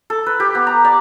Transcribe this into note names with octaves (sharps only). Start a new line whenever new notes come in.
A4
B4
G4
B3
A#5
D5